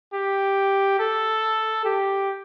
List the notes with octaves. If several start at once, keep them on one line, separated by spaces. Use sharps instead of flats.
G4
A4
G4